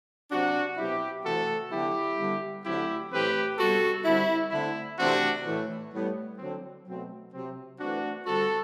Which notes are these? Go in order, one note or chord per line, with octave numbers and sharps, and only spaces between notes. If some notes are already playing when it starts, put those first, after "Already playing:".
C3 F#3 C4 D4 F#4
B2 F#3 C4 E4 G4
C3 E3 A3 C4 F#4 A4
D3 F#3 B3 E4 G4
D3 G3 B3
D3 F#3 A3 C4 E4 G4
A2 E3 A3 C4 G4 B4
C3 G3 B3 F#4 A4
D3 G3 C4 E4
D3 A3 C4 E4
C3 E3 A3 C4 D4 F#4
A2 E3 A3
A2 G3 B3
D3 F#3 C4
B2 F#3 A3 C4
C3 F#3 C4
E3 A3 C4 D4 F#4
D3 G3 C4 F#4 A4